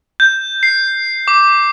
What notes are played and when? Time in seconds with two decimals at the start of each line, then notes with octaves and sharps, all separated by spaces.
0.20 G6
0.63 C7
1.28 D6